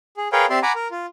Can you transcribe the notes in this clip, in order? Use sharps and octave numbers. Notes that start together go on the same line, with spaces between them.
G#4
G#4 A#4 B4 C#5 F5 G5
C4 G4 D5 E5 C6
F#5 G#5 A#5 B5 D6
A#4
F4